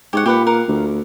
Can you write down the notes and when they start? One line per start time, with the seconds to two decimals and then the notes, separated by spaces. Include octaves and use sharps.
0.13 G#2 G4 C#5 F#5
0.26 A#2 G4 B4 F#5
0.47 A#4 F5 F#5
0.68 D2